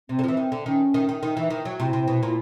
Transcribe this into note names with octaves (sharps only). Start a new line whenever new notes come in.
C3 C4
D3
F3
E3
D#3
D3
D#3 C#4
D#3
D#3
D#3 D#4
E3
D#3
F#3
C3 E4
C3
B2
A#2